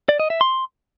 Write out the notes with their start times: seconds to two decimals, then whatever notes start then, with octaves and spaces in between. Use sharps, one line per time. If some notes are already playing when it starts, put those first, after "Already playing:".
0.09 D5
0.20 D#5
0.30 E5
0.41 C6